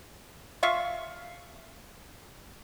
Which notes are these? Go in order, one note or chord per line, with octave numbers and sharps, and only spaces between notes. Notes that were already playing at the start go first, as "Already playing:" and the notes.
F4 E5 F5 C#6